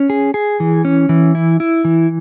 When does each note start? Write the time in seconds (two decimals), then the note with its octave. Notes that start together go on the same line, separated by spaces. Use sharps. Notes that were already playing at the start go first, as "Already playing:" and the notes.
Already playing: C#4
0.10 G#4
0.34 G#4
0.60 E3
0.85 C#4
1.09 E3
1.35 E4
1.60 E4
1.85 E3